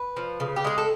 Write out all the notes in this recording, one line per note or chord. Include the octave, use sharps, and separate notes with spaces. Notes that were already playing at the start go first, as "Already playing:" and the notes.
Already playing: B4
F3
C#3
G4
G#3 G#4
A4